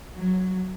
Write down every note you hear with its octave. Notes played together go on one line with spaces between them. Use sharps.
F#3